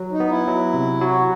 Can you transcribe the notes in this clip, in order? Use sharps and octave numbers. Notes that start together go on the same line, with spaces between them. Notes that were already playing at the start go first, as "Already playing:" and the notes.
Already playing: F#3
D#4
B3
E4
F#3
C3
F#3 F#4